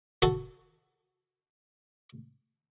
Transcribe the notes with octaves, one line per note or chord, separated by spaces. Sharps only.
F#4 A4